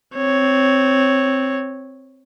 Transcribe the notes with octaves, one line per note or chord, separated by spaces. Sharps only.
C4 C#5